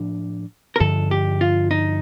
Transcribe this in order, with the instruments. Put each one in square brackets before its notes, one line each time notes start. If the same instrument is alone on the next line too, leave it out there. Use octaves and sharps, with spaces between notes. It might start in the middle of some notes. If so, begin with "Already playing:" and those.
Already playing: [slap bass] A2 F3 D4
[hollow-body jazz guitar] A#4
[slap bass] G2 D3 F3 [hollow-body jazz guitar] A4
[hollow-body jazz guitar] G4
F4
D#4